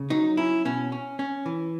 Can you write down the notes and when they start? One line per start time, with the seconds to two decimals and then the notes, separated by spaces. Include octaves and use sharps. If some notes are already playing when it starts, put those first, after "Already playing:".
Already playing: C#3
0.10 F#3 D#4
0.37 C#4 E4
0.65 B2 C#4
0.92 C#4
1.19 C#4
1.46 E3